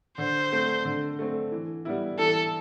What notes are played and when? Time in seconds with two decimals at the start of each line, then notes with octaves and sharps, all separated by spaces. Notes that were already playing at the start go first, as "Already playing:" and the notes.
0.18 D3 C5
0.52 A3 C4
0.85 D3
1.19 A3 C4
1.52 E3
1.85 G3 B3 E4
2.19 E3 A4